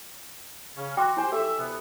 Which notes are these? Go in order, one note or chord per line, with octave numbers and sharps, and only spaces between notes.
C#3 C#4
F#4 G5 C6 D6
E4 G4 C5 G#5
G4 A4 E5 C#6
D2 C3 B3